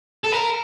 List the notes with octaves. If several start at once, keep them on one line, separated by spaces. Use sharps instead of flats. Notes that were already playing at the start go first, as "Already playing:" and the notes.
A4
A#4